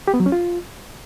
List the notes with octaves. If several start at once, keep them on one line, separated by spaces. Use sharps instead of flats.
G4
B3
F#3
C#4
F4